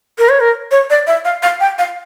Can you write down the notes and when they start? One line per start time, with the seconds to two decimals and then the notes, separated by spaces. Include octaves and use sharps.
0.19 A#4
0.29 C#5
0.40 A#4
0.71 C#5
0.90 D5
1.07 E5
1.25 F5
1.43 F5
1.60 G5
1.78 F5